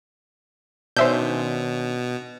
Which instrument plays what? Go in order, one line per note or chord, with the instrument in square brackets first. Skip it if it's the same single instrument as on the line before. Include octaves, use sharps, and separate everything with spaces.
[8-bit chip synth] B2 [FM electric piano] D#3 C#4 D4 [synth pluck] C5 E5 G6